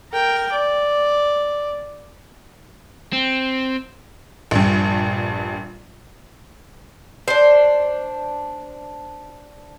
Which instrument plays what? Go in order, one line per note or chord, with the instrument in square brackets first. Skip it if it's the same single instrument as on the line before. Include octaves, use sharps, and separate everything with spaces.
[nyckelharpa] A#4 G5
D5
[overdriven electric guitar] C4
[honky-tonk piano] A#1 G2
[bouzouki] D4 C5